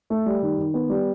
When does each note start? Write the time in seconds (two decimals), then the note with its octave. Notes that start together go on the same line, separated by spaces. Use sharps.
0.10 A3
0.26 G3
0.42 D#3
0.58 D#3
0.74 B3
0.89 G3